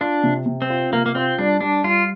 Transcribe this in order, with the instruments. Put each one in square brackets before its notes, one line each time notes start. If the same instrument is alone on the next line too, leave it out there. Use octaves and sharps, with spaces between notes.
[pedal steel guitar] D4 [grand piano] F4
[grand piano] C3
C3
[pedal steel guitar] C4
[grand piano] F4
[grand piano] C3 [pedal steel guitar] A#3
[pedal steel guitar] A#3
[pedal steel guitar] C4 [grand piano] F4
[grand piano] G3 [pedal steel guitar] D4
[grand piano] G3 [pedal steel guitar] D4
[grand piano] G3 [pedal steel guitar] F4